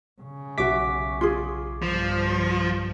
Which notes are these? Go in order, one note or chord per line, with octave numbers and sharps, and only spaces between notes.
C#3
B1 F#4 E5 D6 B6
F4 G#4
G1 F3